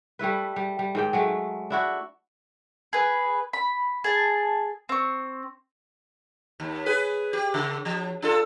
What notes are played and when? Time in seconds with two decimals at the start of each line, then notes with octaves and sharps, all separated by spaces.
0.19 G3 A3 E4 B4
0.56 G3
0.79 G3
0.95 G#2 D#3 G5
1.13 F#3 G#3 A3
1.70 D4 E4 F#4
2.93 G#4 B4
3.53 B5
4.04 G#4 A5
4.89 C4 C#6
6.60 D#2
6.86 G#4 B4
7.33 G4
7.54 C#3
7.85 F3
8.22 D4 F4 A4